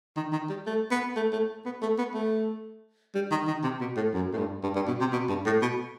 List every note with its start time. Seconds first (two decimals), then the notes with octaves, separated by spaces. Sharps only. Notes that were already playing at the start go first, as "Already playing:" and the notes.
0.17 D#3
0.32 D#3
0.49 G3
0.66 A3
0.91 B3
1.16 A3
1.33 A3
1.65 B3
1.82 A3
1.98 B3
2.14 A3
3.15 G3
3.31 D#3
3.47 D#3
3.64 C3
3.81 B2
3.96 A2
4.13 F#2
4.33 A2
4.38 G2
4.63 G2
4.76 G2
4.88 B2
5.00 C3
5.13 B2
5.29 G2
5.46 A2
5.62 B2